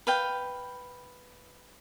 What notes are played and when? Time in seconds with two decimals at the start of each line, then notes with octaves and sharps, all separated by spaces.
0.07 B4 F5 G5